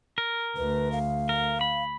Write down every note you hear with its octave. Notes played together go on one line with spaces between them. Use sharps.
A#4
D2 B4
F5
A#4
B5